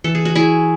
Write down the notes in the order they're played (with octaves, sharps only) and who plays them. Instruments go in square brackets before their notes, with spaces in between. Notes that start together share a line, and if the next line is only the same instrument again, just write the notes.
[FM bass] E3 [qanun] A4
[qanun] G#4
F#4
E4 G#4